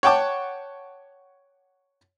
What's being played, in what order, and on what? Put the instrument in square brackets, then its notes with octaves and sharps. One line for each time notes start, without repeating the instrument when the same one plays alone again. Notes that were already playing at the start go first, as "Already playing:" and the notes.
[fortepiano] C#5 F#5 G5 A5 D6